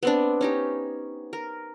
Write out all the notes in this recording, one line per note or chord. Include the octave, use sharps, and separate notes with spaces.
B3 C4 D4
C#4 D#4 G4
A#4